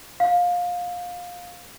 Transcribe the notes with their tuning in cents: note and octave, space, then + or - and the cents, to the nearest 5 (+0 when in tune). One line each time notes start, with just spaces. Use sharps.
F5 +20